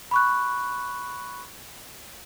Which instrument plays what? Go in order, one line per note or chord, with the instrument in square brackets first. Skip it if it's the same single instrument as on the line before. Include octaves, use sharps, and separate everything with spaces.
[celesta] B5 C#6 F#6